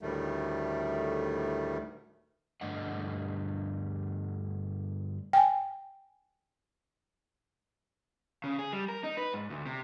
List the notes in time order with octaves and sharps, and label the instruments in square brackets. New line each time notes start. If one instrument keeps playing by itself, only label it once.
[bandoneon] D2 A2 D#3 G3 A3
[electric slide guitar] G2 D3 A3 D4 D#5 F#5
[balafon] G5 G#5
[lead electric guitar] C#3
G#4
G3
A#4
D#4
B4
G#2
D2
C3